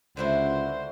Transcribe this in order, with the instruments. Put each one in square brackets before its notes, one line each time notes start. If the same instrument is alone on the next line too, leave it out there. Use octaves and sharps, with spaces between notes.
[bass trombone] C#2 [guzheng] D3 E4 F#4 [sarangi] C5